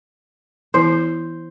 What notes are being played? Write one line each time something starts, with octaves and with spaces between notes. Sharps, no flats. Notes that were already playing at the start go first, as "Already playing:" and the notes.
E3 B3 E4 C5